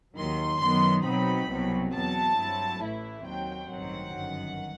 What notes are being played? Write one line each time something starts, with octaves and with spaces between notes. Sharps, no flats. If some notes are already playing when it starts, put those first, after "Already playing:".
D#2 D#3 F#3 C6
F#2 D#3 F#3 B3 C6
B2 F#3 C4 D#4 B5
C2 B2 F#3 C4
E2 B2 F#3 A5
G2 F#3 C4 E4
A1 A2 E3 A3 E4
D#2 D#3 F#3 C4 G5
A1 G2 D#3 F#3 C4 F#5
G1 F#2 D#3